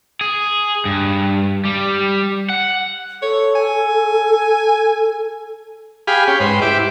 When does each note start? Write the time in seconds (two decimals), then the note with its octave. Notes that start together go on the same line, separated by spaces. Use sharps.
0.21 G#4
0.85 G2
1.65 G3
2.49 F#5
3.22 A4 C#5
3.55 G#5
6.07 G4 G#4 F5 B5
6.28 C#4 G5
6.40 G#2 B4 C5
6.62 E4 G4 D6